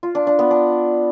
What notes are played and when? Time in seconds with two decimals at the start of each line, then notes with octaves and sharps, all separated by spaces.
0.03 F4
0.15 D4
0.27 D4
0.39 B3
0.51 D4